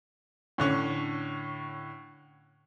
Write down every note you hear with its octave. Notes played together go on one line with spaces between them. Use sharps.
A2 D3 C#4